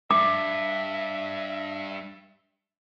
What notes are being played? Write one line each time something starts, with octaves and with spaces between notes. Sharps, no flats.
E2 G2 E5 D6